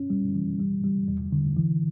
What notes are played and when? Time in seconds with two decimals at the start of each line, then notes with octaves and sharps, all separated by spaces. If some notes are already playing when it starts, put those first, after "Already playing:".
Already playing: C#4
0.10 G3
0.35 E3
0.60 G3
0.84 G3
1.08 E2
1.32 D3
1.57 E3